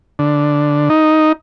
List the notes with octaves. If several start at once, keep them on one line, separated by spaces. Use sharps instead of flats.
D3
D#4